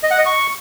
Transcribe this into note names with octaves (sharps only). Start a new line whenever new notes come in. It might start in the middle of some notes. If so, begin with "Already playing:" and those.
D#5
F#5
D#5
C#6